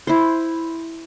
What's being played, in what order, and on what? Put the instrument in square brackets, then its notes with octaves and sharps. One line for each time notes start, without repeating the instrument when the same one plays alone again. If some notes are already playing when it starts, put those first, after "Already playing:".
[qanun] E4 C5